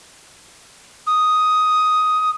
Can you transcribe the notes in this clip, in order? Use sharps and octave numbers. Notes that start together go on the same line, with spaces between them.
D#6